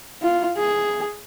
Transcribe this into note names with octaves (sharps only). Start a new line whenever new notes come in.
F4
G#4